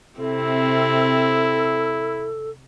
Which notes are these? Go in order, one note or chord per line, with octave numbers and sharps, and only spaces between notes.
C3 C4 E4 A4